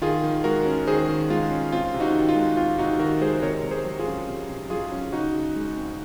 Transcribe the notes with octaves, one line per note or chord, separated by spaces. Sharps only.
D#3 F4 G#4
D#3
G#3 F#4 A#4
C#4
D#3 G#4 C5
D#3
G#3 F4
C#4
C4 F4
C3
D#4 F#4
D#3
F4
G#3
C4 F4
C3 D#4 F#4
D#3 F#4 A#4
G#3 G#4 C5
C3 A#4 C#5
C3
G#4 C5
F#3
F4 G#4
C#4
C3
C3
F#3 F4 G#4
C#4
C#3 D#4 F#4
C#3
G#3
C4